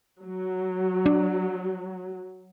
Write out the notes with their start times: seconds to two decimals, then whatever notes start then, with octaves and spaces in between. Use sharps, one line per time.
0.22 F#3
1.06 D4